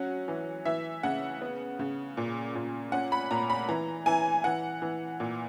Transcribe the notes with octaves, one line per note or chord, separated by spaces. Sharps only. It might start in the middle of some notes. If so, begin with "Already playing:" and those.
Already playing: F#3 C#4 F#5
E3
E3 E5
C#3 F#5
B3
C#3
A#2
A#2
C#4 F#5
B5
A#2 A#5
B5
E3 A#5
E3 G#5
E3 F#5
E3
A#2